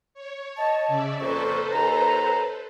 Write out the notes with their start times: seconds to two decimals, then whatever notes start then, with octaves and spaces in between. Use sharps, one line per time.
0.14 C#5
0.57 D#5 A5
0.88 C#3 D5 E5
1.20 F2 A#2 A4 B4 C5 C#6
1.72 D#2 A#5